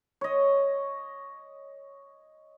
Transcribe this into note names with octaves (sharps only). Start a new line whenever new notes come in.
C#5 D#5